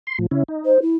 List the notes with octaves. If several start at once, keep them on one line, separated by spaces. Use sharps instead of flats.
C6
A2 F3
C#3 C#4 E4
D#4
C5
E4